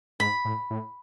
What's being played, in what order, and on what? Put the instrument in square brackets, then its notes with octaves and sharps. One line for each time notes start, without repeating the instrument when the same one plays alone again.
[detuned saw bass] G#2 [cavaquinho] B5
[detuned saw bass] A2
A2